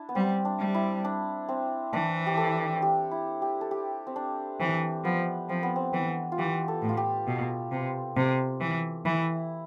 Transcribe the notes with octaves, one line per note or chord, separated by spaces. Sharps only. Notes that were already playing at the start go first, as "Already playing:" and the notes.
Already playing: D4 E4
B3
G3 C4
D4
G3
E4
D4
C4
E3 D4
G4
A4
G4
E4
G4
A4
G4
C4
D4
E3 C4
F3 B3
F3 C4
B3
C4
E3 B3
F4
E3 G4
A4
A2
F4
G4
B2
C3
C3
E3
E3 E4